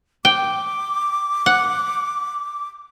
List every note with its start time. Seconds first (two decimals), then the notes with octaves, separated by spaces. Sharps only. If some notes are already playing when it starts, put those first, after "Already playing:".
0.25 G5 D6
1.46 F#5